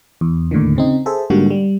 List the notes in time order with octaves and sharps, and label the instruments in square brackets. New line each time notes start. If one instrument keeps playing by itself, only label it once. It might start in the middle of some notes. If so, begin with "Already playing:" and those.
[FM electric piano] E2
D#2 A2 D3 D#3
C#3 C4 D#4
G#4 A4 C5 E5
G#2 D3 G3 A#3 F#4
G3